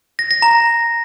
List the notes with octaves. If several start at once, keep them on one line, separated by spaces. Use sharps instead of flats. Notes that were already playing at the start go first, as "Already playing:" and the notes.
A#6
A#6
A#5